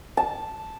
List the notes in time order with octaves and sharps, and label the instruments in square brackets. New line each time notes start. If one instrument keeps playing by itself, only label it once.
[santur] A5